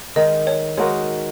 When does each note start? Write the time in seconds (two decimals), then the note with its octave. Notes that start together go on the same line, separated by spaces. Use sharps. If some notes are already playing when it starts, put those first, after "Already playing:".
0.16 D#3 G#3 D#4 D#5
0.47 C#5
0.78 G#3 D#4 F#4 A#4 C#5